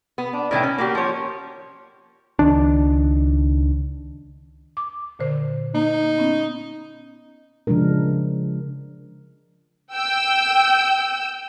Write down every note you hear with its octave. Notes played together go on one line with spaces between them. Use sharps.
B3
D4
A2 D#3 E3 G5
C#4
A#3 F#4 G4
F3 C#5
C#2 D#3 D4
D6
A#2 D3 C5
A#3 D#4
B3 C#4
C#3 F3 G#3 D4 A#4
G5 E6